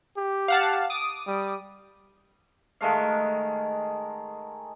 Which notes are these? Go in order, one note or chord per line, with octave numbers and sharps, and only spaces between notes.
G4
F5 F#5 A5
D6 D#6
G3
D#3 G#3 A3 F5